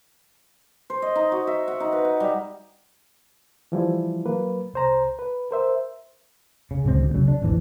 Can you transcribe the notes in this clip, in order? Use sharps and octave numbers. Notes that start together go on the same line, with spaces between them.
C5
D#5
D#4
F#4
E5
F#5
D#4
B4
F#5
G3
E3 F3 G3 E4
F#3 A#3 B4
C2 C5 A#5
B4
A#4 C5 E5
C#3
D1 C#2 B2 C4
D2
C#3 F#3
D4
D1 A1 F2 E3